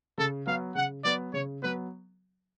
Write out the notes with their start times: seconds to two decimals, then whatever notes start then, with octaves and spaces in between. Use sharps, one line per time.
0.18 C#3 A4
0.47 F#3 B3 F5
0.75 C#3 F#5
1.05 F#3 B3 D5
1.33 C#3 C#5
1.62 F#3 B3 B4